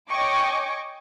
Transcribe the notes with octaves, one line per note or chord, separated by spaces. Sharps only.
C#5 D#5 G5 G#5 C#6 D6